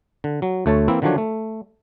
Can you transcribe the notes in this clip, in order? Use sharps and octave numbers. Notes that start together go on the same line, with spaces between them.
D3
F#3
D2 A3 C#5 A5
E3 A#3 C4 E4
D3 D#3 F3 F#3 D4 C#5
A3